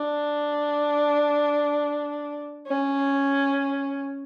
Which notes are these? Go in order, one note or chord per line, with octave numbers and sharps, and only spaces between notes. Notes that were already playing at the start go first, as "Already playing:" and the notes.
Already playing: D4
C#4